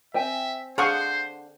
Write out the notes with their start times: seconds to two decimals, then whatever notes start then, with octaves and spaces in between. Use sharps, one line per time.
0.14 C4 E5 G5 G#5
0.78 D3 G#4 C5 F5 F#5 C#6 D#6